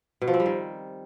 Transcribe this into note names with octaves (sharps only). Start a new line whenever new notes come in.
B2
F3
C4
G3
D#3